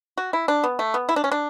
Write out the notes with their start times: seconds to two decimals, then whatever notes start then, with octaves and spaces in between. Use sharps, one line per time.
0.18 F#4
0.33 E4
0.48 D4
0.64 B3
0.79 A3
0.94 B3
1.09 E4
1.16 D4
1.24 C#4
1.32 D4